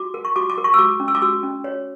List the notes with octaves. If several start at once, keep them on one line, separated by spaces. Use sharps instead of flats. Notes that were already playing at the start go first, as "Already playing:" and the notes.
Already playing: F#4 D6
A#4
C#6
F#4 D6
D6
A#4
C#6
E6
F#4 D6
C#4
E6
D6
F#4 E6
C#4
C#5